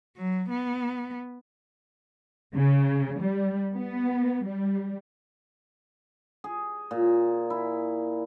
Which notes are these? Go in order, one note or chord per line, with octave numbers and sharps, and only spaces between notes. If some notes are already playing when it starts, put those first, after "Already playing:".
F#3
B3
C#3
G3
B3
G3
G#4
A#2
E4